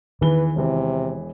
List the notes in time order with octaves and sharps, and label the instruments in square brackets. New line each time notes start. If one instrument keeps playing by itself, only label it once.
[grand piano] E2 E3 G7 [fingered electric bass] D#3 [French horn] B4
[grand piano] E1 E3 [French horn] C3